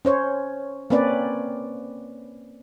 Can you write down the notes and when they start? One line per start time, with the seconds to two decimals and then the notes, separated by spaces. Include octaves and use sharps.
0.05 C#4 C5 C#5
0.90 A#3 C4 C#4 B4 D5